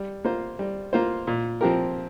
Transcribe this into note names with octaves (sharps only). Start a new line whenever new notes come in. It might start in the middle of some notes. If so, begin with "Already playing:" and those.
Already playing: G3
A#3 F4 C5
G3
A#3 F4 C5
A#2
F3 C4 G4 A#4